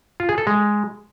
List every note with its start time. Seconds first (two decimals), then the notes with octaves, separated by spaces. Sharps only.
0.20 F4
0.29 G#4
0.38 A4
0.47 G#3